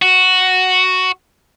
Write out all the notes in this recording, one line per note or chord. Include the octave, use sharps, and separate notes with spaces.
F#4